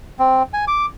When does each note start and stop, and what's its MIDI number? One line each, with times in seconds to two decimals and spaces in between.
0.19 0.43 60
0.53 0.65 80
0.68 0.86 86